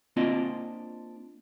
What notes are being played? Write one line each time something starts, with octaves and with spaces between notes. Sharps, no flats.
A#3 C4 D4 F4 D#5